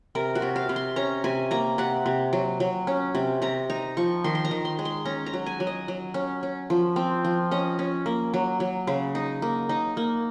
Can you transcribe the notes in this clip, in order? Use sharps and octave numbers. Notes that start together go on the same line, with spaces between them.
C3 A#4
F#4
C3
F5
C3
C6
C#4 A#5
C3 G#5
A#3 A#5
C3 F#5
C3
F#3
F#3
C#4
C3
C3 A#5
D#4 A#5
F3 C#6
D#3 C6
C6
A#5
D#3
C6
G#3
C6
C#4 A#5
A#5
F#3
G#5
F#3
D#5
F#3
C#4
C#4
F3
C4
F3
C#4 D#5
C#4
A#3
F#3
F#3
C#3
D#4
A#3
D#4
A#3